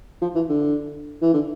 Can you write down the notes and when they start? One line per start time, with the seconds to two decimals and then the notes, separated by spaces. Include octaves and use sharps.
0.22 F3
0.35 E3
0.49 D3
1.22 E3
1.34 D3